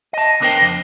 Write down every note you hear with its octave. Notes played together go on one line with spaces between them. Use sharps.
D#5 A5
C#2 B3 D4 A#4 C5 G5
F2